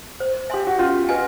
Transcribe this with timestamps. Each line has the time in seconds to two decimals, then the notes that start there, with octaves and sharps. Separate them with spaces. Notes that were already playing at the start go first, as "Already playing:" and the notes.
0.20 C5
0.50 G4 E5 G#5 C6
0.67 F#4
0.78 C#4 F4
1.09 F#4 B4 D#5 G#5